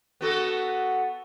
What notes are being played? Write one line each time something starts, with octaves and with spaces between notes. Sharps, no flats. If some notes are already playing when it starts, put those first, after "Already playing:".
B3 F#4 A4